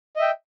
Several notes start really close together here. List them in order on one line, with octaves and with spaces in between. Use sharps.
D#5 E5 G5